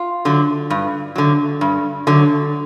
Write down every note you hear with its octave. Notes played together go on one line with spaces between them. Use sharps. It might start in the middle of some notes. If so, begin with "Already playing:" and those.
Already playing: F4
D3 F#3
G2
D3 F#3
G2
D3 F#3